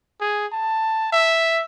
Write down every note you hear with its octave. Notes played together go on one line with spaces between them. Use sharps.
G#4
A5
E5